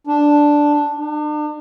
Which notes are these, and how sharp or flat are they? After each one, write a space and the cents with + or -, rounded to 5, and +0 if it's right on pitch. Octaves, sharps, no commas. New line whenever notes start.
D4 +0
D4 +40